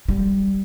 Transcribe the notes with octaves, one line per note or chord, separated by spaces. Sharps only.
G3